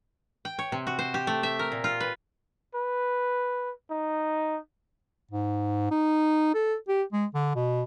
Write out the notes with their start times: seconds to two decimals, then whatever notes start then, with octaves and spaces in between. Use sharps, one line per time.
0.45 G5
0.59 C#5
0.72 C3
0.87 F#4
0.99 C5
1.14 G4
1.27 A3
1.43 E5
1.59 A#4
1.72 A#2
1.84 F4
2.00 B4
2.75 B4
3.91 D#4
5.31 G#2
5.91 D#4
6.55 A4
6.88 G4
7.12 G#3
7.35 D3
7.55 B2